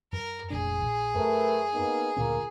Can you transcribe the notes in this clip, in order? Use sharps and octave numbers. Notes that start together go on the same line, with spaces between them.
F#2 A#4
F1 A#1 D4 G#4
A#1
F#2 A3 A#4 B4
A#3 B3 D#4
D2 A#2 A#3 C#4 F4 A#4